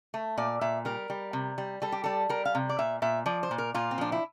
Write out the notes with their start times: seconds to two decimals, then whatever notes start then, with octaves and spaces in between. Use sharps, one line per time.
0.14 A3
0.38 A#2 D5
0.61 A#2 E5
0.85 G3 A#4
1.10 G3
1.33 C3
1.58 G3
1.82 G3 A4
1.92 G4
2.04 G3 A4
2.29 G3 A#4
2.45 F5
2.55 C3
2.69 D5
2.79 A#2 E5
3.02 A#2 E5
3.26 F3 D5
3.43 C5
3.51 A#2
3.58 A#4
3.74 A#2 F4
3.91 C4
3.98 F3 D4
4.12 E4